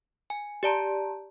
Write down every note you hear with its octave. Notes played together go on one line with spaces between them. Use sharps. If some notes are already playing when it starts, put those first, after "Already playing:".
G#5
G4 D5 A5 A#5